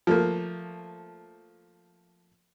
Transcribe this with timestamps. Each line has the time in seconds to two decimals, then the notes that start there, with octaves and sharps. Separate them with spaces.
0.07 F3 A3 A#3